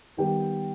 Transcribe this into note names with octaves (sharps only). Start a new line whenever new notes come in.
D#3 G3 B3 G4 G5